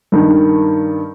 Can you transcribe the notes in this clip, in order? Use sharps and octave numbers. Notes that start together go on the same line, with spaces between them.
G2 D#3